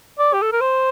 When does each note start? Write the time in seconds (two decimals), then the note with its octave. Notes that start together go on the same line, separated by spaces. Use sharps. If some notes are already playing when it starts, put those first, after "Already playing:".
0.19 D5
0.34 G4
0.42 A4
0.52 A#4
0.61 C5